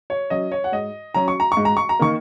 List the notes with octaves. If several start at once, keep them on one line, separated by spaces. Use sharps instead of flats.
C#5
F#3 C#4 D#5
C#5
F#5
G#2 D#5
F#3 C#4 A#5
C#6
A#5
C#6
G#2
A#5
C#6
A#5
D#3 A#3 C#6